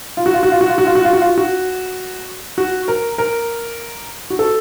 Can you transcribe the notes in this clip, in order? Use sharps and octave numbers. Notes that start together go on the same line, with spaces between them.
F4
F#4
F4
F#4
F4
F#4
F4
F#4
F4
F#4
F4
F#4
F4
F#4
F#4
A#4
A#4
F#4
A4